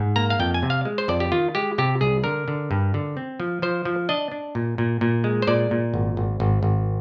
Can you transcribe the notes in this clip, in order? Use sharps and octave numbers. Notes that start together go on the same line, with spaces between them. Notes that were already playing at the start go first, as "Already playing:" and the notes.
Already playing: G#2
A#3 A#5
F5
F2 G5
G#5
C3
F5
G#3
C5
F2 D5
G4
D#3 F4
G#3 G4
C3 G4
C2 G#4
D3 A#4
D3
G2
D3
C4
F3
F3 C5
F3
D4 D#5
D4
A#2
A#2
A#2
G#3
C5
A#2 D5
A#2
G#1
G#1
G#1
G#1